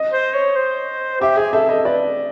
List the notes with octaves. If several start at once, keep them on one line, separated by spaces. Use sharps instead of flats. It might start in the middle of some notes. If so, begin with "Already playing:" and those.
Already playing: D#5
C5
C#5
C5
G4 E5
G#4 E5
A4 E5
A4 D#5
B4 D5